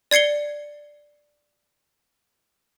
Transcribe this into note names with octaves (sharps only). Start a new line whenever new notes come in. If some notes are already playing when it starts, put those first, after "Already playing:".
D5 G#6 C7 C#7 G7